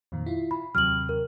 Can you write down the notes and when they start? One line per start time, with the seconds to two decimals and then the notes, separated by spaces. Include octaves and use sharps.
0.12 F2 A#2 D#3
0.26 E4 F4
0.51 B5
0.75 D#2 C3 F#3 F6 F#7
1.09 A#4